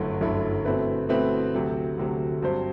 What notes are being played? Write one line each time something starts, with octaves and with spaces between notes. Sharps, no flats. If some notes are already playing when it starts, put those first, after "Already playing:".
Already playing: G1 F#2 D3 A3 E4
G1 F#2 D3 A3 E4
B2 A3 C4 E4 B4
B2 A3 C4 E4 B4
D2 C3 F#3 A3
D2 C3 F#3 A3
G2 F#3 C4 G4 C5